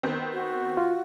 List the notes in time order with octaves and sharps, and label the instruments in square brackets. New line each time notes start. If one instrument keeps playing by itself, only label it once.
[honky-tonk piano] D#3 B3 C4
[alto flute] F#4
[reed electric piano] F4